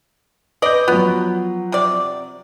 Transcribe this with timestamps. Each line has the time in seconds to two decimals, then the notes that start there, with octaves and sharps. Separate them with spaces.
0.62 B4 D5 D#5 G6
0.88 F3 F#3 B3
1.72 C3 D5